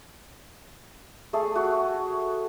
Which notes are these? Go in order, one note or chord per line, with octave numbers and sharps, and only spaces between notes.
A3 G#4 A4
F#4